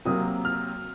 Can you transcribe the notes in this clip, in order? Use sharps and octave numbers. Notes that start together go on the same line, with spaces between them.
C3 F#3 A#3 D#6
F6